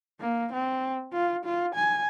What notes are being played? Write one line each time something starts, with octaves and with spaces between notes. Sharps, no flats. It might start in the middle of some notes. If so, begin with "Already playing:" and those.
A#3
C4
F4
F4
G#5